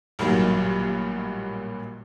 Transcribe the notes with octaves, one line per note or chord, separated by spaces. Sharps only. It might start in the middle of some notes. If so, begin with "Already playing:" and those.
A1 G2 A#2 D#3 F#3